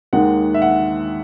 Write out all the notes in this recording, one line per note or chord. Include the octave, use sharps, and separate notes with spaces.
D#2 D#3 G#3 F#5
E5
F#5